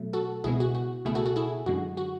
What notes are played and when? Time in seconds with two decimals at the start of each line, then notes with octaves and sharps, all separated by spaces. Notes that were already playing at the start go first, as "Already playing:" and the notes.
Already playing: B2 F#3 A3
0.13 F#4 A4
0.44 C#2 B2 G#3 B3 E4 G#4
0.60 F#4
0.75 F#4
1.05 C#2 B2 A3 E4 G#4
1.15 F#4 A4
1.26 F#4 A4
1.36 E4 G#4
1.66 F#2 D3 G#3 F#4
1.97 F#4